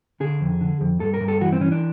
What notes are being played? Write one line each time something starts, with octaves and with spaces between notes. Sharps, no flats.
D3 G#4
F2
D3
F2
G2 A4
A#4
G2
A4
E3 F#4
C4
E3 C#4
D4